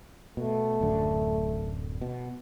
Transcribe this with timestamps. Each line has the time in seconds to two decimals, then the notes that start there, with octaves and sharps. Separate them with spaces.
0.37 B2 A3
0.81 D1 F#2 D3
2.01 B2